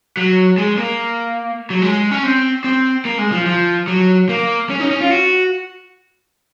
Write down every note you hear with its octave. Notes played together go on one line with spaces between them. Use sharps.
F#3
G#3
A#3
F#3
G#3
C#4
C4
C4
A#3
G#3
F3
F3
F#3
A#3
C#4
D#4
C#4
F4
F#4